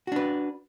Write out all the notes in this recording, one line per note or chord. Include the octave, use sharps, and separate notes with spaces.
D4 F#4 B4